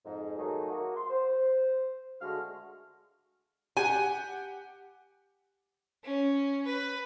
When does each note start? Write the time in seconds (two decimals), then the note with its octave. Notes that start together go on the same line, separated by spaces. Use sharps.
0.05 F2 G#2
0.37 D#3 F#3 A3 A#3 D#4 G#4
0.70 A#3 F#4
0.96 C6
1.10 C5
2.21 D3 G#3 A3 F#4 F6
3.77 G4 F#5 G#5
6.04 C#4
6.66 B4